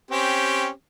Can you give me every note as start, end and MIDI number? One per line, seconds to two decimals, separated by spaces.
0.11 0.69 60
0.11 0.69 61
0.11 0.69 67